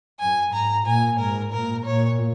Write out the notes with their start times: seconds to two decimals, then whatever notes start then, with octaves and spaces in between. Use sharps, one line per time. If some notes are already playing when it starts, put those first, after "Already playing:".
0.20 F#2 G#5
0.53 G#2 A#5
0.86 A#2 G#5
1.19 G#2 A#4
1.52 A#2 A#4
1.85 A#2 C#5